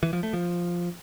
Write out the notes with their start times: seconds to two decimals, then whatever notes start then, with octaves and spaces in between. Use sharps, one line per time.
0.03 E3
0.13 F3
0.23 A3
0.33 F3